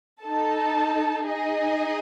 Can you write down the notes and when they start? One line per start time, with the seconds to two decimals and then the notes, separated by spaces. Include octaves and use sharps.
0.22 D#4 A4 A5
1.26 D#4 G#4 D#5